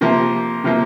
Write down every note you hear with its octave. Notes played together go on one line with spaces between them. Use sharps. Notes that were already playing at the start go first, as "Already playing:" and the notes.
C3 F3 A#3
C3 F3 A#3